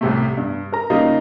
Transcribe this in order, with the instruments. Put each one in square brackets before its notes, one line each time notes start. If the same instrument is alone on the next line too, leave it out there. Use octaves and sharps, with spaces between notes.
[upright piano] C2 A2 C3 A3
G2
A#4 A#5
C#3 G3 A#3 D#4 F4